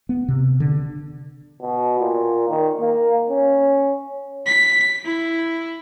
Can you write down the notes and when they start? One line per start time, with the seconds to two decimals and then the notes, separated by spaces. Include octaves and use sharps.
0.09 B3
0.28 C3
0.60 D3
1.62 B2
1.99 A#2
2.49 D#3
2.79 A#3
3.30 C#4
4.46 B6
5.05 E4